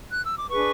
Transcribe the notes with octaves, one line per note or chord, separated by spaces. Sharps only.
F#6
E6
D6
D4 G#4 B4 C#6